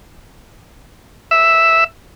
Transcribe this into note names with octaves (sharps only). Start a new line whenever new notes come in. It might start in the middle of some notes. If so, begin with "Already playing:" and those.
E5